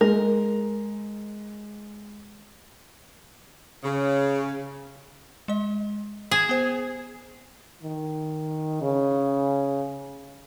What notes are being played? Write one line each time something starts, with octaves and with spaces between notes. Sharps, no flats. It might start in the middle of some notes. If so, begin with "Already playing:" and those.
G#3 A#4
C#3
G#3 D#5
G#4 G#6 E7
B3 C5
D#3
C#3